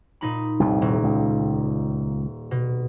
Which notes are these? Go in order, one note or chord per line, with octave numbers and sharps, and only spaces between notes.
A#2 D#4 B5
C2 F2 A2
D#1
C#2
B2